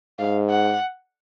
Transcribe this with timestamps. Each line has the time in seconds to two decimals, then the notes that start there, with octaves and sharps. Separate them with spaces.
0.19 G#2 F5
0.50 F#5